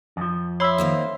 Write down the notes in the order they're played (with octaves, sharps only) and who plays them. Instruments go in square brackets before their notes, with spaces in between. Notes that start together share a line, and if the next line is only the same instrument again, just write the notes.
[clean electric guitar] F2 F3
[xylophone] C#5 B5 E6 [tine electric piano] E5 C6
[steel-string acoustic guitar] D#3 A#3 C4